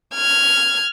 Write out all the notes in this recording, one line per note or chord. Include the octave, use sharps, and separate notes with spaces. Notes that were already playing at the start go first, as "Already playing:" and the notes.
F6 G#6